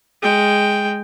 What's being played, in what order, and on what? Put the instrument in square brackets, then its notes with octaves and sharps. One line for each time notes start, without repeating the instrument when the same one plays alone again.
[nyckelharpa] G#3 G5